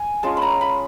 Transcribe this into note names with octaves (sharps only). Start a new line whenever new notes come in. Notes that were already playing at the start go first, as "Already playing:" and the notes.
Already playing: G#5
G#3 C#4 F4 A5
B5
A#5
B5